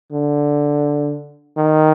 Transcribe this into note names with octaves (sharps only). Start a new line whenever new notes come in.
D3
D#3